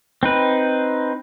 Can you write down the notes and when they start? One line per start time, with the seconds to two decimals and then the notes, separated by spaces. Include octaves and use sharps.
0.23 C4 D#4 B4